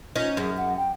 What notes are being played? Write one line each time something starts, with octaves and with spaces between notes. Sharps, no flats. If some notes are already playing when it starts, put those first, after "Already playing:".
C#4 D#4 F4
F#2 G#4
F#5
G5